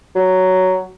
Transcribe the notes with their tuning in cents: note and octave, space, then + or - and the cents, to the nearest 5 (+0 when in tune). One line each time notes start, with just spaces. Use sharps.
F#3 +10